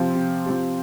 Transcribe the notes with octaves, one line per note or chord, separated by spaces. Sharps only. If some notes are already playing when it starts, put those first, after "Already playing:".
Already playing: C3 F3 C4 G4
C3
F3 C4 G4